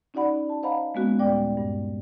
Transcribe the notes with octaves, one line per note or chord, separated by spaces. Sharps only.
C#4 D#4 F#4 D5 F#5 B5
A5
C5 D#5 F5 F#5 A#5 B5
G#3 A#3 B3 C#4 F#4
D#2 A#2 G3 D5 G5 D6
G2